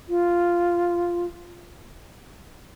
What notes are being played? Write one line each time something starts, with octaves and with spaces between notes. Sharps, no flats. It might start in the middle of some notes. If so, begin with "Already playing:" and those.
F4